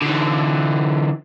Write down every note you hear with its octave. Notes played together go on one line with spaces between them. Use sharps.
D3 E3